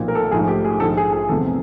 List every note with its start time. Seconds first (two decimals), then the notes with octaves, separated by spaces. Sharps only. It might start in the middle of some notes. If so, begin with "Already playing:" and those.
Already playing: B1 A#2 F3
0.08 A#4
0.15 A4
0.31 A#1 G#2 F3 A3 G#4
0.48 G4
0.65 G#4
0.80 A#1 G#2 F3 A4
0.97 G#4
1.13 G#4
1.29 E2 C3 F3 A4